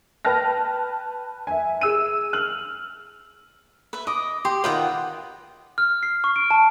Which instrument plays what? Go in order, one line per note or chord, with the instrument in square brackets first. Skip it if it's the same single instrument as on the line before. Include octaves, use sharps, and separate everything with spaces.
[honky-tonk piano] B4 G5 A5 F6 A#6
E5 G#5
G#4 E6 D#7
F6 F#7
[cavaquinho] B4 E5
[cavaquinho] D#5 [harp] D6 D#6
[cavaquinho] G4 [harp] C6
[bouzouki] D#3 F4 F#5 [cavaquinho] B4 D#5 G5
[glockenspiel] F6
C7
C#6
D7
A5